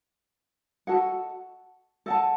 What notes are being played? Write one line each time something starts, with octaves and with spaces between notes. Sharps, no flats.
F#4 A4 D#5 F#5
A4 D#5 F#5 A5